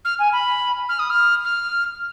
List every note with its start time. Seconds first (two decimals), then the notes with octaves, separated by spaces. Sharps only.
0.05 F6
0.19 G#5
0.33 B5
0.89 F6
0.99 D#6
1.10 F6
1.45 F6